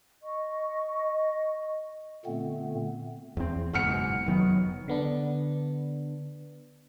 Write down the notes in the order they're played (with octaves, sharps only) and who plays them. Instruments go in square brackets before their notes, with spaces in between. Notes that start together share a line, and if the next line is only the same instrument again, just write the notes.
[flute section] D#5 C#6
[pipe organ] A#2 D3 A3 B3 C4
[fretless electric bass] E2 C4
[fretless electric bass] F#1 G#2 B2 [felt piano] F#5 F6 C#7
[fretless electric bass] F1 D#3 B3 [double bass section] F#3
[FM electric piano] D3 B3 D4